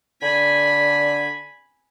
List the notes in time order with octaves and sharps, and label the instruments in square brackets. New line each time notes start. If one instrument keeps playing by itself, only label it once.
[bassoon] D3 [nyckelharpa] G#5 B5